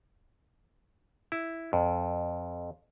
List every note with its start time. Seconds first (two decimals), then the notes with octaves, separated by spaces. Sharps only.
1.32 E4
1.73 F2